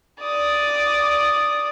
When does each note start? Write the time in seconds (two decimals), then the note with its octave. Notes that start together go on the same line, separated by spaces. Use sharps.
0.21 D5 D#6